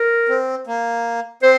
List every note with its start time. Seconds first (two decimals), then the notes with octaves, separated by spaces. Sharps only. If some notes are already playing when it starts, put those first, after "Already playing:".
Already playing: A#4
0.29 C4
0.67 A#3
1.43 C4 C5